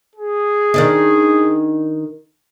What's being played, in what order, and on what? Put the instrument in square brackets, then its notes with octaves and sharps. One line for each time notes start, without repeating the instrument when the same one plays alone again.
[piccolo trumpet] G#4
[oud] D#3 D4 D#4